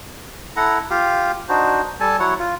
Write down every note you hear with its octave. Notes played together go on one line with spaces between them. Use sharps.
E4 A4 F#5 A#5
F4 G4 F5
D4 D#4 F#4 C5
G3 A4 G#5 A5
F#3 E4 C#5 F#5
F4